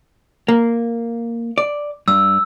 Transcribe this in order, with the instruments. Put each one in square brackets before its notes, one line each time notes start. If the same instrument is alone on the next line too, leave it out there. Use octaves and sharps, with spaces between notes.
[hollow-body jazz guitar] A#3
D5
[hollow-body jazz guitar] G2 [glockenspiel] E6